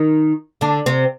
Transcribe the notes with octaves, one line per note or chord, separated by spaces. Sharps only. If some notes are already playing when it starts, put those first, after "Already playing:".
Already playing: D#3 D#4
D3 D4
C3 C4